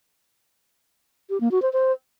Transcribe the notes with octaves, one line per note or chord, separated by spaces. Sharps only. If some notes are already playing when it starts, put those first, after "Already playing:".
G4
A#3
F#4
C5
C5